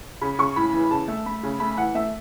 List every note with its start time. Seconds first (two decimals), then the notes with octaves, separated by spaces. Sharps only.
0.21 C#3 B5
0.39 C#3 C#6
0.56 A2 B5
0.73 E3
0.90 C#3 A5
1.08 A3
1.26 A3 B5
1.43 C#3
1.60 A3 B5
1.77 E3 F#5
1.95 A3 E5